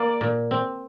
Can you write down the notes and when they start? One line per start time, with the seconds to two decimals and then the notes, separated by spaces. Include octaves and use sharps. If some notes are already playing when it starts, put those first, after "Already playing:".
Already playing: A#3 D5
0.21 A#2
0.51 C4